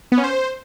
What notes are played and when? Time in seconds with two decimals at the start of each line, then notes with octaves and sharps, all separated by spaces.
0.12 B3
0.18 C#4
0.23 C5